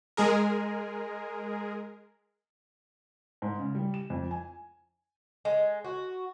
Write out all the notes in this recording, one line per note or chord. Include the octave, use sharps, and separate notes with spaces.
G#3 G#4 A#4
G#2
C#3
G3
E7
F2
G#5
G#3
F#4